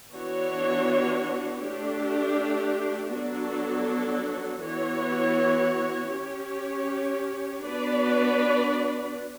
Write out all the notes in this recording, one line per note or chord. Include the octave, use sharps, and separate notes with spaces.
E3 B3 D4 F#4 C#5
A3 D4 G4
F#3 B3 D4 F#4 A4
E3 B3 F#4 C#5
C#4 G4 C#5
B3 D4 F#4 B4 D5